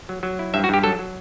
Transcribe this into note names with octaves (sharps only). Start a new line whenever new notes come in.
F#3
F#3
E4
G2 E5
F#4
G2 G4
F#3 A4
F#3